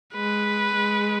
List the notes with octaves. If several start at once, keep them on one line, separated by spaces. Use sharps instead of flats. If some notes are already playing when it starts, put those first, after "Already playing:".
G#3 B4
G#3